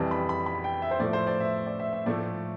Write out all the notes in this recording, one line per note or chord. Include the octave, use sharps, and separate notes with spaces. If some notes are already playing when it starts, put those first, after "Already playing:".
Already playing: F2 E3 G3 A5
B5
B5
B5
G5
E5
C5
A2 F3 A3 D5
C5
D5
E5
D5
E5
E5
A2 F3 A3 D5